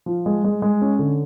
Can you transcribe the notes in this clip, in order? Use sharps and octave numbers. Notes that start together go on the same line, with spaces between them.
F3
G#3
G#3
G#3
C#4
D3